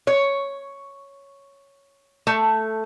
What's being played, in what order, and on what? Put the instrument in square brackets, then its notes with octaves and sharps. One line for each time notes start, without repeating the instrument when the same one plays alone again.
[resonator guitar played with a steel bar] C#5
A3